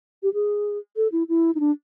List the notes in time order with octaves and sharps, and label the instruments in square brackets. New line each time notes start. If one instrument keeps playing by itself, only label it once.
[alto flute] G4
G#4
A4
E4
E4
D#4
D4